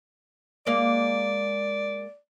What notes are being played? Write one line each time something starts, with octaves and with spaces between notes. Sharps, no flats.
G#3 A#3 D5 F5